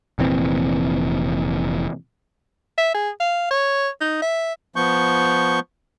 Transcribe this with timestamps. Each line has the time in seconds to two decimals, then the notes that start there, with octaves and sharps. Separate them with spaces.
0.19 F1 A#2 E3 C4
2.78 E5
2.95 G#4
3.20 F5
3.51 C#5
4.01 D#4
4.22 E5
4.76 F3 B3 C#6 G6